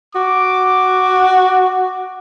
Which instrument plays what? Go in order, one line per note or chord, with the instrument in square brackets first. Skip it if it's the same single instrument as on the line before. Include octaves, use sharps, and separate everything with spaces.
[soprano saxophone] F#4 [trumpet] D6